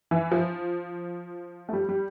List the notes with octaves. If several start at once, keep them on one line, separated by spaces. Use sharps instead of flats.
E3
F3
A3
G3
G3